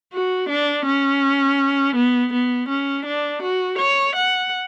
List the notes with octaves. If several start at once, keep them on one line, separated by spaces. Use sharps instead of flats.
F#4
D4
C#4
B3
B3
C#4
D4
F#4
C#5
F#5